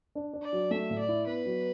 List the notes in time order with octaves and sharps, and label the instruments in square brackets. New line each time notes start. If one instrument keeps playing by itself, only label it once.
[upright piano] D4
D4
[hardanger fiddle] D5
[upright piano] F#3
[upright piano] A3 [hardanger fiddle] E5
[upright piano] A2
[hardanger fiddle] D5
[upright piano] E4
[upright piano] B3 [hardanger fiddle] B4
[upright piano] F#3